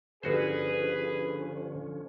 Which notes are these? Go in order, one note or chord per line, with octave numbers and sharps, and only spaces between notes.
G1 D3 F3 C#4 F#4 G#4 B4 C5